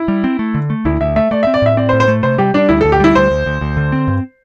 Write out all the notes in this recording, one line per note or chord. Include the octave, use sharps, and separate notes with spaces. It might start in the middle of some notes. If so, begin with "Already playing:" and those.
Already playing: E4
G3
C4
A3
D3
A3
D2 E4
D2 E5
A3 E5
A3 D5
E5
C4
D5
A2 E5
C4 D5
C5
A2
C5
A3
C3 C5
G3 G4
G3 D4
D2 E4
A4
D2
G4
G3 E4
D2 C5
D2
D2
D2
D3
C4
G2